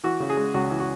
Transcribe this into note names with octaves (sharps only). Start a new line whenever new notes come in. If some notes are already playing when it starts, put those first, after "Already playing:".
E3 F#4
C#3
G#4
G#3
C#2 F#4
E3
F#4